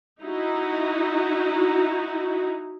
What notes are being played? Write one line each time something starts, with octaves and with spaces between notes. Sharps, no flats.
D#4 E4 F#4